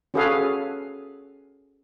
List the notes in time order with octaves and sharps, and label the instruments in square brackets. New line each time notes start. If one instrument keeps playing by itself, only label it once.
[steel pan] C#4 F#4 G#4 A4 B4 F5